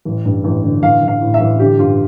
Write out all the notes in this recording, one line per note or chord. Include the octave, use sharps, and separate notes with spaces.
A1
G2
A1
D3
A1 F5
A1
F5
A2
E5
A1
D3 G4
G2 F4